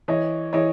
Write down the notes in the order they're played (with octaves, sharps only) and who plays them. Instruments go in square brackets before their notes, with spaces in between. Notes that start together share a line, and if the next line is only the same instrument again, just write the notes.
[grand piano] E3 [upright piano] C#5 D#5
[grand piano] E3 [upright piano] C#5 D#5